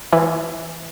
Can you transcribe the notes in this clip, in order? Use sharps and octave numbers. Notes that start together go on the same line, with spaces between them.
E3